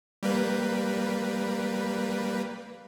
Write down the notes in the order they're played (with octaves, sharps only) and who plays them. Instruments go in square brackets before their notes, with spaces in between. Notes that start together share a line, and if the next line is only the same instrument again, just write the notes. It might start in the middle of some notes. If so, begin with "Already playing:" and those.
[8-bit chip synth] G3 A#3 B4